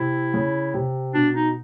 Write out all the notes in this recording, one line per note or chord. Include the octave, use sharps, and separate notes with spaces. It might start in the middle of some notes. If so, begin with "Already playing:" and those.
Already playing: C3 E4
C#3
C3
B2 D4
D#4